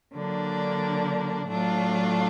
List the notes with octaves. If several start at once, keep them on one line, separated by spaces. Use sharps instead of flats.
D3 F#3 A#3 D4
A2 F#3 A3 D4 F4